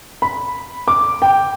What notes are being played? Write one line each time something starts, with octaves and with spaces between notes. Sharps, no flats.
B5
D6
G5